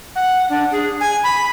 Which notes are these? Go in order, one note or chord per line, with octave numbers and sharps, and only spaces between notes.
F#5
D4
G#4
G#5
B5